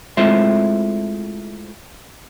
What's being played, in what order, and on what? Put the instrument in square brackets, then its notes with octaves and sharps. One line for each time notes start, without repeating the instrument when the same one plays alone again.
[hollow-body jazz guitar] G#3 A3 C4 E4 F4 E5